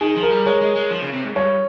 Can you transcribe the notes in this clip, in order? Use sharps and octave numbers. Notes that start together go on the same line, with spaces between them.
D#3 G#4
F3
A#4
G3
G#3 C#5
G#3
G#3
F3
C#3
C3
G#2
G2 C#5